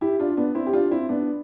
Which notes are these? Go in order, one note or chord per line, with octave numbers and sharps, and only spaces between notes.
E4 G4
D4 F4
B3 D4
C4 E4
G4
D4 F4
C4 E4
B3 D4